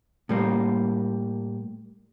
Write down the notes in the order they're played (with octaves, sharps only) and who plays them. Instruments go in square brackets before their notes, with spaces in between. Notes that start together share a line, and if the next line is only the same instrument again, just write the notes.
[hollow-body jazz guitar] A2 G3 A#3